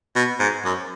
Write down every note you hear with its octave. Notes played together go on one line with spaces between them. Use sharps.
B2
G#2
F#2